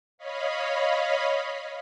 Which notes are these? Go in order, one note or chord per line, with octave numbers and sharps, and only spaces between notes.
C#5 D#5 F5 B5